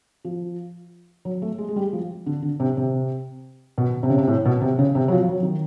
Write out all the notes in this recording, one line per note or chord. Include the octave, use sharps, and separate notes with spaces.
F3
F#3
A3
G#3
G#3
G3
F3
D3
D3
C3
C3
B2
C3
C#3
C3
A2
B2
C3
C#3
C3
F#3
F3
F#3
D#3